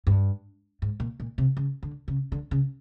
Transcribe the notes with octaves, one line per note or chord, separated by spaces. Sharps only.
G2
G#2
A#2
A#2
C3
C#3
D3
C#3
D3
C#3